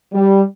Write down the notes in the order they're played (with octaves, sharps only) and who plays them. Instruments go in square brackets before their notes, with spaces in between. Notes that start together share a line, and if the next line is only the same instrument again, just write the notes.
[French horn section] G3